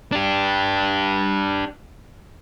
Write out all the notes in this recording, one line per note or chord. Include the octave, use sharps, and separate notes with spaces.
D4 G4